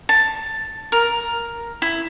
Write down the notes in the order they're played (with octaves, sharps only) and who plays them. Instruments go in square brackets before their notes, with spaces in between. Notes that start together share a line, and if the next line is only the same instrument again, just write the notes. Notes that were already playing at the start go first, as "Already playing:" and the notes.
[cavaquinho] A5
A#4
E4